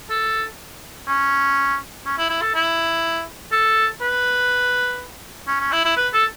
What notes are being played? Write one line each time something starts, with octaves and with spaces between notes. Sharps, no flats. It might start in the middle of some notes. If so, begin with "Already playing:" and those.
A4
C#4
C#4
E4
E4
A4
E4
A4
B4
C#4
C#4
E4
E4
B4
A4